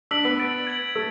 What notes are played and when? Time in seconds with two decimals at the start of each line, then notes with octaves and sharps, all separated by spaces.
0.11 D4 E6 B6 D7 F#7
0.25 B3
0.39 E6 A6 D7
0.67 G#6 D7 F#7
0.96 A3 E6